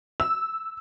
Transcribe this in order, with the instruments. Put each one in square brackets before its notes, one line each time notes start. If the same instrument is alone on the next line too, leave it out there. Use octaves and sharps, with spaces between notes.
[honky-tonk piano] E6